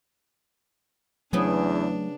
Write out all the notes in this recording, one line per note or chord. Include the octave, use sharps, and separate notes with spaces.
E2 C#3 F#3 A3 B3 D4 G#4